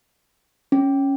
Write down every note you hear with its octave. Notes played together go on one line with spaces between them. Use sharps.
C#4